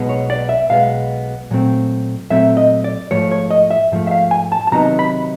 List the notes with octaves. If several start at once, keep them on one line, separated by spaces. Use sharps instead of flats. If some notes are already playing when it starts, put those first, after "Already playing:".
Already playing: B1 B2 G#3 B3
C#5
D5
E5
B1 B2 G#3 B3 F5
A#2 F#3 A3 C4
A#2 F#3 A3 C4 E5
D#5
D5
G#2 F3 A3 C#5
C#5
D#5
E5
G#2 F3 A3
E5
F5
G#5
A5
A5
C3 D#3 F#3 B3 D#4 A#5
B5